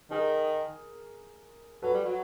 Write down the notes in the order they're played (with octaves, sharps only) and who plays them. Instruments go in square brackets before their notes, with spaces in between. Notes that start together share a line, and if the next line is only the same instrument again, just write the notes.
[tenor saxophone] D#3 [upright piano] G#4 A#4
[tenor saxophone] F#3 [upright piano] A4 B4
[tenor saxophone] G3
F#3